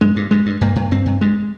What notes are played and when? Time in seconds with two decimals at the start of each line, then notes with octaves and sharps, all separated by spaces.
0.01 G2 G#3
0.16 G2
0.31 G2 G#3
0.46 G2
0.61 G2 A#3
0.76 G2
0.91 G2 C4
1.06 G2
1.21 G2 G#3